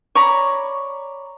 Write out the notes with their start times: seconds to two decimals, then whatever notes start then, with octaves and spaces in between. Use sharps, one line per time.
0.15 C#5 D5 A#5 B5